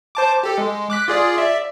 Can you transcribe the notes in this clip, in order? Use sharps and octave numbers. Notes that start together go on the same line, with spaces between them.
C5 A5 D6
G4 A4
G#3
D6 F#6 B6
F4 G#4 D5
D5 E5